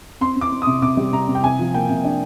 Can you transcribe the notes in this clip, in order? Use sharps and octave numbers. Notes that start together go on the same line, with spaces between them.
C4 C6
C4
D6
C4
D#6
C3
C3 D6
G3
C3 A#5
C3
G5
C3 G#5
F3
A#3 G5
C3
D4